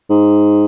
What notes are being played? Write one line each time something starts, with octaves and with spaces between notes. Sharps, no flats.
G#2